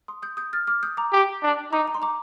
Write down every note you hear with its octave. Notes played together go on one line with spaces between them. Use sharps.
C6 D#6
D#6 G6
D#6 G6
F6 A6
D6 F6
D#6 G6
A#5 D6
G4
D4
D#4 A#5 D6
A#5
C6
A#5 D6